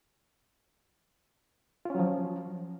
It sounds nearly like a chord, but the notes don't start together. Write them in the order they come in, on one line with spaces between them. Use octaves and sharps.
F4 C#4 F#3 F3